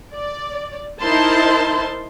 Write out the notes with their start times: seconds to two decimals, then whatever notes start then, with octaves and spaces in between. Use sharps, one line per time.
0.14 D5
1.02 D#4 E4 A#4 C5 A5 C6